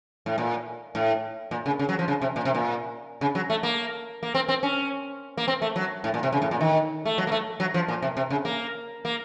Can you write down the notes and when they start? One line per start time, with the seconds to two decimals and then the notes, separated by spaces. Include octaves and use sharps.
0.26 A2
0.38 A#2
0.95 A2
1.51 A#2
1.66 C#3
1.79 C#3
1.89 F#3
1.99 F3
2.08 C#3
2.22 C3
2.36 A#2
2.45 C3
2.55 A#2
3.21 C#3
3.35 F#3
3.50 A3
3.63 A#3
4.23 A#3
4.35 C4
4.48 C4
4.63 C#4
5.37 A#3
5.48 C4
5.62 A3
5.76 F#3
6.04 A2
6.14 A#2
6.23 C3
6.32 C#3
6.42 A2
6.51 A#2
6.61 D#3
7.05 A3
7.18 F#3
7.27 A#3
7.32 A3
7.60 F#3
7.74 F3
7.88 A#2
8.02 C3
8.17 C3
8.30 C#3
8.45 A#3
9.05 A#3